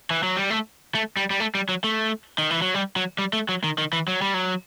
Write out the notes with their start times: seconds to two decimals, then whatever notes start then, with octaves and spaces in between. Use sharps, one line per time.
0.11 E3
0.23 F#3
0.37 G3
0.50 A3
0.95 A3
1.17 G3
1.30 G3
1.40 A3
1.55 G3
1.69 F#3
1.84 A3
2.38 D#3
2.50 E3
2.62 F#3
2.74 G3
2.96 F#3
3.18 G3
3.33 A3
3.49 F#3
3.64 D#3
3.78 D#3
3.93 E3
4.08 F#3
4.22 G3
4.34 F#3